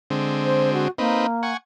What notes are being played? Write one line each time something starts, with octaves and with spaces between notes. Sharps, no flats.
D3 G#3 C4
C5
F#4
A#3 C4 D#4 B4
F#5 G#5 C#6